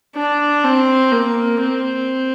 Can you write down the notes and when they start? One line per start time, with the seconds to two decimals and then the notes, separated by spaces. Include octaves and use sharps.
0.15 D4
0.64 C4
1.12 A#3
1.61 C4